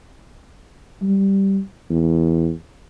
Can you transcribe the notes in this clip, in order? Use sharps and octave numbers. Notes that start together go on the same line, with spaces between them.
G3
E2